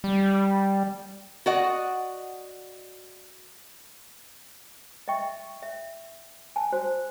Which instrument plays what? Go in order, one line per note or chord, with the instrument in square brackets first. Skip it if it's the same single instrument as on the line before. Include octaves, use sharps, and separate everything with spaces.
[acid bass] G3
[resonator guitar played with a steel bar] F#4 D5 D#5 F#5
[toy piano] D#5 E5 G5 C#6
E5
G#5 A5
F#4 C5